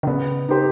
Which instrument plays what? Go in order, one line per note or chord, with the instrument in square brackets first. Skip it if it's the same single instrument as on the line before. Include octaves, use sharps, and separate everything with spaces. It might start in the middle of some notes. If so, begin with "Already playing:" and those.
[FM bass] D3
[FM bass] C#3 [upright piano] B3
[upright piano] D#4 G4 C5